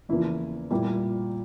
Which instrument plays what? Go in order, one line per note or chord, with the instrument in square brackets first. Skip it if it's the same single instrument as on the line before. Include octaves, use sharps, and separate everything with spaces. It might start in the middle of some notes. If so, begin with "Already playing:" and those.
[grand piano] E2 C#3 F3 A#3 E4
A#2 G3 A#3 E4